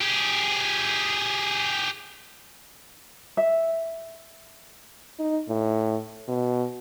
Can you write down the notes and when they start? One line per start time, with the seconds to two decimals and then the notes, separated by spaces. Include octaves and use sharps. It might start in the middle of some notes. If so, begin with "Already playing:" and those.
0.01 G4 G#4
3.37 E5
5.19 D#4
5.49 A2
6.28 B2